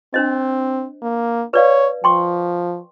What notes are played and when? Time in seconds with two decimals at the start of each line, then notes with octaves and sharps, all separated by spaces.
0.14 C4 D4 C5 D#5
1.02 A#3
1.54 B4 C#5 D5 F5
2.04 F3 G5 C6 C#6